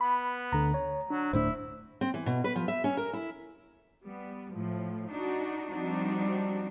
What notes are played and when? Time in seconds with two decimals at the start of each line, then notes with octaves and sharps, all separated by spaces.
0.01 B3 B5
0.52 D2 D3 A#5
0.74 C#5
1.10 F#3 D4
1.33 D1 A2 D4 E4 C5
2.01 C4
2.14 E3
2.26 B2
2.44 B4
2.56 F3
2.68 E5
2.84 C#4
2.97 A#4
3.13 E4
4.05 G3 B3
4.55 A2 F3
5.11 D4 D#4 F#4
5.70 F3 G3 C4 D4 D#4 F#4